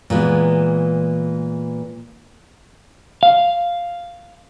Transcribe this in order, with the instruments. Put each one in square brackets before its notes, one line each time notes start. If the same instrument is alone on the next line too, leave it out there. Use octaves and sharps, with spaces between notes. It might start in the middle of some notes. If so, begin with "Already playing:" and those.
[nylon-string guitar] A#2 E3 G#3 B3
[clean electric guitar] F5